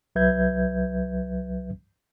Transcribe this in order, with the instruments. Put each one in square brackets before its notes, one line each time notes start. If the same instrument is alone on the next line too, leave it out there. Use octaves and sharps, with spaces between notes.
[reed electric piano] C2 F#3 B4 E5 G6 G#6